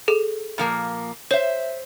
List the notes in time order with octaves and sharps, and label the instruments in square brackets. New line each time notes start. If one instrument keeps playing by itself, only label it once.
[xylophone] G#4 A4
[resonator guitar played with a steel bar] A#2 F3 A#3
[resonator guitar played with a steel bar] C5 E5 [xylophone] C#5